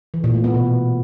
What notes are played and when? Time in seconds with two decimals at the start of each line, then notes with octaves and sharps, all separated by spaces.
0.14 E3
0.24 A#2
0.34 A3
0.44 B3
0.54 B2